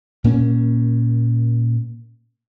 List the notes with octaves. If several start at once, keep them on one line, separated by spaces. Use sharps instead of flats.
A#2 A#3 C#4